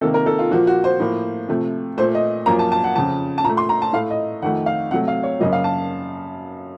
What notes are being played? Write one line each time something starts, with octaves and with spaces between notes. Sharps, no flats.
C3 D#3 A#3 A4
A#4
A4
F4
A#2 F3 A#3 F#4
F#4
C5
A2 F3 A#3
C3 F3 A3
A#2 A3 C5
D#5
F#2 F3 A#3 A#5
A5
A5
F#5
F2 C#3 F3 A5
A5
A#2 A#5
A3
C6
A#5
A5
A2 A3 F5
D#5
F2 D#3 A3 F#5
F5
C3 F#3 A3 F#5
F5
C#5
F#2 C#3 F#3 A#3 D#5
F5
A5